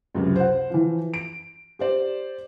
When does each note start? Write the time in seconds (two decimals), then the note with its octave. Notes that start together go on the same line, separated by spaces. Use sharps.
0.15 C#2 F#2 C3
0.36 C5 F#5
0.70 E3 F3
1.14 D7
1.79 G4 C5 D5